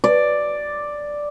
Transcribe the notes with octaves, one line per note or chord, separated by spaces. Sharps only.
D5